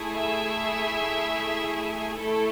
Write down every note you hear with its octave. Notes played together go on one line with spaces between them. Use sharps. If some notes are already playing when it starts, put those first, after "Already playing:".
Already playing: A3 E4 G#4
E5
A3 E4 A4